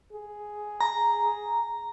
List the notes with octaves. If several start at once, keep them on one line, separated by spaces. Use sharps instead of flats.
G#4
A#5